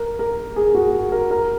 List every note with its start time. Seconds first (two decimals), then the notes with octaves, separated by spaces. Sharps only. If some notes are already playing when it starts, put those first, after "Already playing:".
Already playing: A#4
0.19 A#4
0.56 G#4
0.75 F#4
1.12 A#4
1.31 A#4